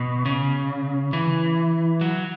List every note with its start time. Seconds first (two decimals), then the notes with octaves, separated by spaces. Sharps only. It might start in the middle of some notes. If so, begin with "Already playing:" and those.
Already playing: B2
0.25 C#3
1.13 E3
2.01 F#3